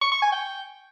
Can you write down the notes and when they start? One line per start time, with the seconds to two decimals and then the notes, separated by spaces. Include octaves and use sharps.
0.01 C#6
0.12 C#6
0.22 G#5
0.32 G5